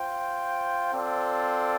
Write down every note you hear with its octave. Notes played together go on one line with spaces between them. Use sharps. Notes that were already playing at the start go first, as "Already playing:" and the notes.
Already playing: F4 C5 G5
C4 F4 A4 D5